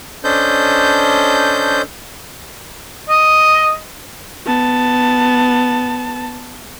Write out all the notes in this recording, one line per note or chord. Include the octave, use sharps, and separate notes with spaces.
C#4 D4 A4 C5 D#5 G6
D#5
B3 A5